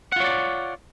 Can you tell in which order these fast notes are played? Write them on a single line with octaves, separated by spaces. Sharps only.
F#5 F4 C#5 D5